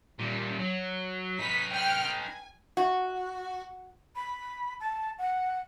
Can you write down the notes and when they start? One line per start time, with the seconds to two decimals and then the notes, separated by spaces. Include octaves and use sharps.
0.19 A#2 G3
0.59 F#3
1.39 D#4 B4 B6
1.71 G5 F6 F#6
2.17 G#5
2.77 F#4
4.16 B5
4.80 A5
5.18 F#5